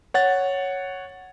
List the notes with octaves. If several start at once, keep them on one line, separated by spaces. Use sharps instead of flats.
C#5 F#5 A6